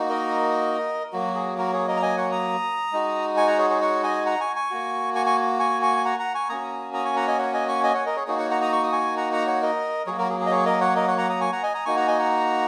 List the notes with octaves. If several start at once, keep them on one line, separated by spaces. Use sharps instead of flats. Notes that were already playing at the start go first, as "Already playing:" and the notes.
Already playing: A#3 D#4 F#4
A#4 D#5
F#3 A#3 F#4
G#4
F#4 A#4
G#4 C#5
A#4 D#5
A#5
D#5 G#5
C#5 F#5
A#5 D#6
G#3 D#4 F#4
G#5 C#6
F#5 A#5
G#4 C#5
G#4 C#5
C#5 F#5
D#5 G#5
F#5 A#5
G#5 C#6
G#5 C#6
A#3 F#4
G#5 C#6
G#5 C#6
G#5 C#6
G#5 C#6
G#5
F#5 A#5
F#5 A#5
G#5 C#6
A#3 C#4 F#4 A#5 D#6
A#5 D#6
G#5 C#6
F#5 A#5
D#5 G#5
C#5 F#5
D#5 G#5
G#5 C#6
D#5 G#5
C#5 F#5
A#4 D#5
G#4 C#5
A#3 D#4 F#4 G#4 C#5
C#5 F#5
F#5 A#5
A#5 D#6
C#6
D#6
G#5 C#6
F#5 A#5
F#5 A#5
C#5 F#5
A#4 D#5
F#3 A#3 F#4 G#4 C#5
F#4 A#4
G#4
G#4
D#5
G#4 C#5
A#4 D#5
C#5 F#5
A#4 D#5
C#5 F#5
F#5 A#5
A#5 D#6
G#5 C#6
F#5 A#5
D#5 G#5
A#5 D#6
A#3 D#4 F#4 G#5 C#6
F#5 A#5
D#5 G#5
F#5 A#5